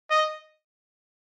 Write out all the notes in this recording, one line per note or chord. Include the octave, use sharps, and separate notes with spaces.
D#5